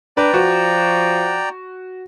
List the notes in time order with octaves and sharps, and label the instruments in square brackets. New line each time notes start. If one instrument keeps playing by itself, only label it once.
[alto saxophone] D4 [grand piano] B4 [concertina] D5 G5 A#5
[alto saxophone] F3 [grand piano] F#4